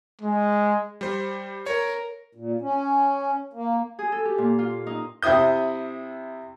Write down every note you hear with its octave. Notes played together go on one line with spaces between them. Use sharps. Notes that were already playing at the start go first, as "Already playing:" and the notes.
G#3
G3 C5
A#4 C#5
A#2
C#4
A#3
G#4
A4
G4
A#2
F4
D#4
C3 C4 E4 D#6 G6